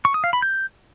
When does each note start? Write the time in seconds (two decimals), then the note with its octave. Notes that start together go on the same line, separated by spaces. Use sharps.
0.05 C#6
0.14 D#6
0.24 F5
0.33 B5
0.42 G6